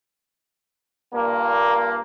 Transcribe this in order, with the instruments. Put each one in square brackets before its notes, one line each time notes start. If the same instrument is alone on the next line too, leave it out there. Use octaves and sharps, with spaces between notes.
[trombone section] G2 A#2 A#3